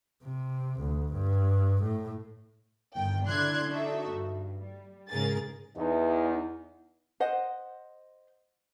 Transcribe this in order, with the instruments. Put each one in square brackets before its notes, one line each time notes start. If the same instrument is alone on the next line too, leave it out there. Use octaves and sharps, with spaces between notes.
[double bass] C3
D2
G2
A2
[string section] G1 D#3 G5
D3 D4 E4 C6 F#6 G#6
D4 D#4 F#4 A4 E5
G2
G3
G#2 C#3 G#4 A#4 A6
[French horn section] E2 [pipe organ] D#4
[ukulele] C5 D#5 F#5